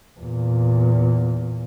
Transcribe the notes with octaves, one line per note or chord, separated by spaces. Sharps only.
E2 A#2